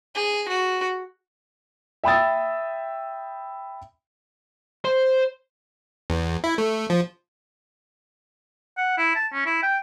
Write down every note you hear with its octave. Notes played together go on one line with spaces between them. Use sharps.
G#4
F#4
E5 G5 B5 D#6 E6 A6
C5
E2
E4
A3
F3
F#5
E4
A5
C#4
E4
G5